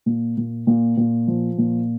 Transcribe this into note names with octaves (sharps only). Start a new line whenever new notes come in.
A#2
A#2
A#2
A#2
F3
A#2